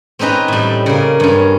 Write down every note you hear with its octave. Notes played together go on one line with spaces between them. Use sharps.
C4 C#4 D#4 B4 A#5
A2 G3
C#3 A#3
G2 C#4